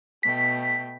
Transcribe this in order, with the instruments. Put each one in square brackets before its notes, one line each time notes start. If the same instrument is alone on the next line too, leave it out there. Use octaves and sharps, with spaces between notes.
[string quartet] B2 A3 G5 [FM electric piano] B6